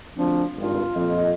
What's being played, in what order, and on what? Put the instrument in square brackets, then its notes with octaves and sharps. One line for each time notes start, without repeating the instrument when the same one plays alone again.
[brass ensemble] D2 C4 D4 [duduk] F3
[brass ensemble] G#1 G2 [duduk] F4
[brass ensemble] F2 A#2 D#5